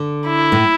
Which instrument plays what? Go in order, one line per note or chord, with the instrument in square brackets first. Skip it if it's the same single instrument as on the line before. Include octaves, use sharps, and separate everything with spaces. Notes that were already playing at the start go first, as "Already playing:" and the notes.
Already playing: [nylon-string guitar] D3
[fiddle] E4
[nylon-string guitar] A2